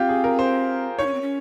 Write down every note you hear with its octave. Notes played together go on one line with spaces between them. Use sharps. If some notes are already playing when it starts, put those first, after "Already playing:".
Already playing: C4 F4 G4
G#4
A#4
C5
D#4 C#5
C#4
C4
C#4